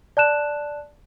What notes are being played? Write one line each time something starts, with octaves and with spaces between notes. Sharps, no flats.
D5 A5 F#6 E7